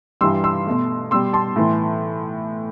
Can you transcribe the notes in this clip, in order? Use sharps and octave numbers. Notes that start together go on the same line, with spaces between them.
G2 E3 G3 C6 E6
C6 E6
B2 A3
B2 G3 C6 E6
A5 C6
A2 E3